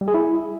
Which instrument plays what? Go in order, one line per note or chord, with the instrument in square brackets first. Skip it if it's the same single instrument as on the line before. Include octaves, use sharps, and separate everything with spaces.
[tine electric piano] G3
G#4
E4